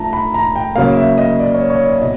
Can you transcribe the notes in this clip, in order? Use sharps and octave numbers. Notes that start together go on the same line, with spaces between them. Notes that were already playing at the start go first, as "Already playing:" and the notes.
Already playing: F3 A3 D4 A5 A#5
B5
A#5
G5
C#3 F#3 A#3 F5
E5
D#5
D5
C#5
C#5
D5
B2 D#5